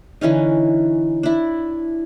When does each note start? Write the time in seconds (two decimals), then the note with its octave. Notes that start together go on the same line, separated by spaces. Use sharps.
0.21 D3 E3 C#4 D#4
1.23 D4 E4